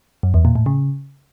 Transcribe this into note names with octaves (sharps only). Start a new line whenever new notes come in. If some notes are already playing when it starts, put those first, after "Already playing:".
F#2
E2
A#2
A2
C#3